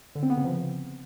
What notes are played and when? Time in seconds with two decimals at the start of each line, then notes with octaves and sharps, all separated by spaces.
0.15 D3
0.23 C4
0.30 B3
0.37 C#3
0.44 F3